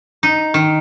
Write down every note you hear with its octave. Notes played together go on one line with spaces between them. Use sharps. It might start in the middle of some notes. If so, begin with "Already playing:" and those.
D#4
D#3